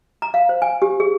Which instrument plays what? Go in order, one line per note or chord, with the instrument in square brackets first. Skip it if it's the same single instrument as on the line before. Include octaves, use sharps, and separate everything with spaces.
[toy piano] A#5
F5
C5
G#5
G4
G#4